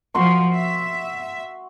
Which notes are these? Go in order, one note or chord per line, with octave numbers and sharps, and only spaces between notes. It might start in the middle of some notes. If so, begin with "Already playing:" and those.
F3 F#4 C6 C#6
E5